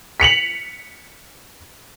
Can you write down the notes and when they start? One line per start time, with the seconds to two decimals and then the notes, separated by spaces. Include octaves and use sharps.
0.20 B6 C#7 F7 F#7